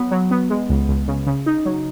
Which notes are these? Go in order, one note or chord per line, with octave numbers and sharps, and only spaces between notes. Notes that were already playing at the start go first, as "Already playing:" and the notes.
Already playing: F#3 B3
F#3
B3
G#3
C#2
C#2
C#3
C#3
D#4
F#3